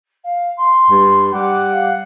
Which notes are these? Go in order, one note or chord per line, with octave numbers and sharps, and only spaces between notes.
F5
C6
G2
G3 F#5 D6
F5